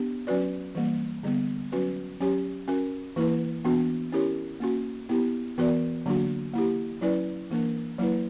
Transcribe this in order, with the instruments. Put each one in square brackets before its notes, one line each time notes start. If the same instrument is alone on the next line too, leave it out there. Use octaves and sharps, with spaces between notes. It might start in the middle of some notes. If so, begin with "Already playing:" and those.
Already playing: [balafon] B3 D4 G4
F#3 C#4 F#4 B4 D5
E3 G3 A#3
D3 G3 B3
F#3 C#4 F#4 B4
F#3 C#4 G4 C#5
C#4 F#4 A#4
E3 A#3 E4 B4
E3 B3 D4 F#4
C#4 E4 G4 A#4 C#5
A#3 C#4 F#4
B3 E4 G4
E3 B3 F#4 A#4 D5
D3 F#3 A#3 D4 F#4
A#3 E4 G4
F#3 C#4 E4 B4 D5
E3 A#3 D4 A#4
F#3 A#3 E4 B4